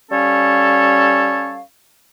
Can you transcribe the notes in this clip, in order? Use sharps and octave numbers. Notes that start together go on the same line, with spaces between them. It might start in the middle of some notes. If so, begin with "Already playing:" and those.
G3 C#4 A4 C#5 F5